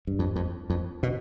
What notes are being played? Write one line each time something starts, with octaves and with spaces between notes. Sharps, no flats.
G2
F2
F2
F2
B2